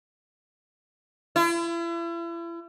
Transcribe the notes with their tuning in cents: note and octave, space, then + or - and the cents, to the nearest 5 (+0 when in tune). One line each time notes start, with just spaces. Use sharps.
E4 +40